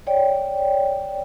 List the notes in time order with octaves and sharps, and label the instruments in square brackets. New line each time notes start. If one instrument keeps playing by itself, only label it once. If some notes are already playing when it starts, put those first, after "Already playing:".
[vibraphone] C#5 D5 G5